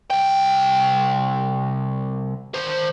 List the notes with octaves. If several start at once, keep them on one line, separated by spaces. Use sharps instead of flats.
C2 G5
D#3 C5